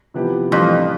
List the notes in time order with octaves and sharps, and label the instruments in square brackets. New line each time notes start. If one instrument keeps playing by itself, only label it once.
[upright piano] C3 F3 B3 E4 G4
[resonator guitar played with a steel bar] F2 [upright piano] A2 E3 G3 D4